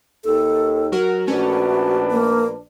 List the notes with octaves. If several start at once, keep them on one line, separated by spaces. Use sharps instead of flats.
D#2 A4
F#3 F#4 A#4
A#1 A3 C#4 D4 F#4 B4
A#3